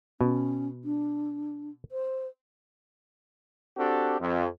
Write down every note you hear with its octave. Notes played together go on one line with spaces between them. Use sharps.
B2 C#4
D4
C5
C4 D4 F#4 G4 A4
F2